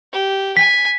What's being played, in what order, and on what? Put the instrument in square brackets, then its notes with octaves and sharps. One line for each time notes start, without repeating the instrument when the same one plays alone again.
[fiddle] G4
[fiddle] G#5 [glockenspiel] B6